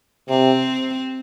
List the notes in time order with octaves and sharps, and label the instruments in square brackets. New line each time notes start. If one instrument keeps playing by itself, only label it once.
[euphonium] C3 [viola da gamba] C4